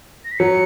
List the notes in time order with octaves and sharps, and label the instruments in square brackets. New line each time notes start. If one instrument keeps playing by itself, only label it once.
[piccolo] A#6
B6
[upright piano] F#3 [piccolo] C#7